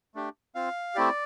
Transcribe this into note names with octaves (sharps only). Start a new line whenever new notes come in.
A3 D4 G4
C4 F4 F5
A3 C4 E4 G4 D5